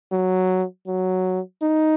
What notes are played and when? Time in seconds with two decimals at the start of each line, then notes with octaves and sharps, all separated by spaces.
0.12 F#3
0.87 F#3
1.62 D#4